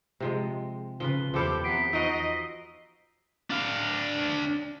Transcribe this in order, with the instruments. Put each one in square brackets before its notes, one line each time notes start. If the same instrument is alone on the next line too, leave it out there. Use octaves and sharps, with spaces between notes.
[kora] C3 F3 G#3
[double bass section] C#3 [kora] F3 F4 B4 [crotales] G7
[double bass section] E2 [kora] F3 A4 F5 [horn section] E4 G4 C5
[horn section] C3 B3 [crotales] B6 C7 D7
[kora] F3 F#4 [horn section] D#4 D#5 [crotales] E6 C7 D7
[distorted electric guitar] D4 F5